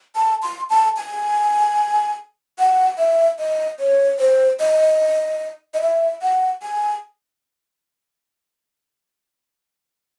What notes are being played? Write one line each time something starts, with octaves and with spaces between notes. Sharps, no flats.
A5
C6
A5
G#5
F#5
E5
D#5
C#5
C5
D#5
D#5
E5
F#5
G#5